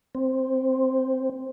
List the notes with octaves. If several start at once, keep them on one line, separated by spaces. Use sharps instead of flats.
C4